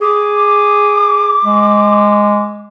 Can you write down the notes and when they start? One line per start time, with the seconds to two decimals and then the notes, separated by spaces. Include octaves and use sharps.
0.01 G#4 D6
1.45 G#3